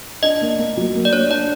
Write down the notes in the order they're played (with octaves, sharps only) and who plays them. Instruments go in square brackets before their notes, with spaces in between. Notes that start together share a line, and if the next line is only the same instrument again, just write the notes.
[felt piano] D4 [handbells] D#5
[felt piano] A#3
A#3
F#3
A#3
[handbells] D5
[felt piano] D4 [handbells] C#5
[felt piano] D4 [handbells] D5